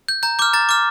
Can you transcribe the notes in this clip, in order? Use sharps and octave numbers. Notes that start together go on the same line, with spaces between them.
G6
A#5 G6
D6 F6 G6
A#5 A6
D6 F6